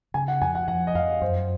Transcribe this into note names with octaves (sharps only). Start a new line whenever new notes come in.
C#3 G#5
F#5
F2 G#5
F#5
F3 F#5
D#5
F2 F5
F#2 C5